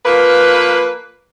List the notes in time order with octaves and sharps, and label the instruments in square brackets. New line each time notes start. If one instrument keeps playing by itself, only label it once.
[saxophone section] F3 A#3 B4